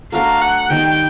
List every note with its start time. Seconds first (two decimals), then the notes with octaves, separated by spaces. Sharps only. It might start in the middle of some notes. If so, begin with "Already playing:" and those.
0.12 A3 D4 F#4 A#4 F5
0.41 F#5
0.69 D#3 G3 A#3 D#4 G5